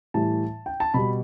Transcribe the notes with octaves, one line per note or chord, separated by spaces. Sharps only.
A2 E3 G3 A5
G5
A5
B2 G3 B5